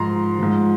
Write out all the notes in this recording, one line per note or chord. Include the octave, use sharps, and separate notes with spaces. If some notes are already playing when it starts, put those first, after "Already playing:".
Already playing: G#2 F3 A#5 C6
G#2 F3